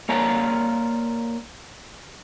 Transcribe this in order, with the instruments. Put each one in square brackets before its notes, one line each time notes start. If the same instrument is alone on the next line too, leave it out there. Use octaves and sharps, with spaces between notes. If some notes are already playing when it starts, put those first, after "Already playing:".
[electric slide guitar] A#3 C#5 D5 A5 A#5